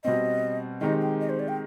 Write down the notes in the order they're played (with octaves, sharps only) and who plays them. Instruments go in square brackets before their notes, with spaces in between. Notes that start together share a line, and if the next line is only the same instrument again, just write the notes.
[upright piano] B2 G3 C4 [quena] D#5
[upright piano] D#3 G#3 C4 D#4 G4 [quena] D#5
[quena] G5
D#5
C5
D5
G5